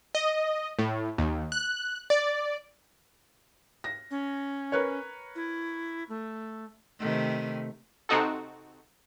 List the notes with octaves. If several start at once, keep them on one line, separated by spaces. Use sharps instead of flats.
D#5
A2
D#2
F#6
D5
A#6
C#4
A#4 B4 C#5
E4
A3
C3 D#3 A3
C3 C4 D#4 F#4 A4